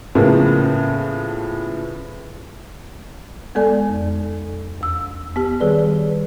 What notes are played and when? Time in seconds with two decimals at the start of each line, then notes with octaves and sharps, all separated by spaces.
0.15 A2 C#3 F3 A#3 B3
3.55 G#3 B3 A4 D5 G#5
3.90 F2
4.81 E2 E6
5.36 B3 G4
5.60 D#3 G3 G#4 B4 D5